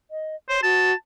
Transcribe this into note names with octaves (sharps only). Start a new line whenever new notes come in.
D#5
C5 C#5
F#4 A5